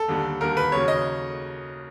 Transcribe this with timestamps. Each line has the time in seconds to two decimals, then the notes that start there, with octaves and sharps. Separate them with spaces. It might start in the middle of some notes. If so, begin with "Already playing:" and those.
Already playing: A4
0.08 D#2 D3 G3
0.40 D#2 D3 G3 A#4
0.57 B4
0.72 D#2 C#3 F#3 C#5
0.88 D#5